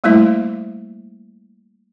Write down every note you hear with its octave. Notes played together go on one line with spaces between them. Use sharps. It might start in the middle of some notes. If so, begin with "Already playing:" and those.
G3 A3 A#3 E4 C5 E5